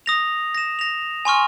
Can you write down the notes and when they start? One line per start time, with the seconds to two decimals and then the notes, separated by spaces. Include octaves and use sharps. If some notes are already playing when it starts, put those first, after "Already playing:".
0.06 D#6 A#6 F7
0.55 A#6 E7
0.79 A#6 F7
1.25 G#5 C6 C#6 F6